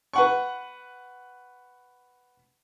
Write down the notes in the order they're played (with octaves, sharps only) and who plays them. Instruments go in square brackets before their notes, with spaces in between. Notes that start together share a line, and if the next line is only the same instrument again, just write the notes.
[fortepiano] B4 F#5 C#6